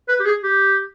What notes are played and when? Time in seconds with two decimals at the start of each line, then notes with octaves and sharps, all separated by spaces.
0.09 B4
0.20 G4
0.26 G#4
0.43 G4